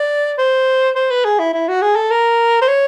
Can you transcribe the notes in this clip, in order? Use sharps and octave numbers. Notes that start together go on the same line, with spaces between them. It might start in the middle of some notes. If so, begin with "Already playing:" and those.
Already playing: D5
C5
C5
B4
G#4
E4
E4
F#4
G#4
A4
A#4
C5
C#5